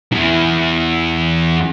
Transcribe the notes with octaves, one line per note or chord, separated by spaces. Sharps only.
E2 E3